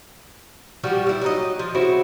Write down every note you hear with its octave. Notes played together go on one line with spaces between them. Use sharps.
F3 G3 F#4 G4
G3 E4
F#3 D#4 D#5
F3
C#3 C4 E4 F#4